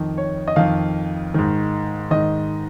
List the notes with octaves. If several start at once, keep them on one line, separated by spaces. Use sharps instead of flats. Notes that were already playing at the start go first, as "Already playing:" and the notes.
Already playing: F2 D#3
C#5
D#5
F2 D#3 F5
G#2 D#3
G#2 D#3 D#5